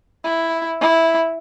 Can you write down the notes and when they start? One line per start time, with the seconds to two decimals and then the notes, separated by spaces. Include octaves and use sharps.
0.24 E4
0.81 E4